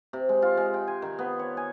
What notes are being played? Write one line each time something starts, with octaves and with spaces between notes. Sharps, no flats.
C3
G#3
F4
G#3
G5
G#5
D#3
B3
C#5
G#5